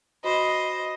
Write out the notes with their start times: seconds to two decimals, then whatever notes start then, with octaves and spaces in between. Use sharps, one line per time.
0.24 F#4 C5 D#5 B5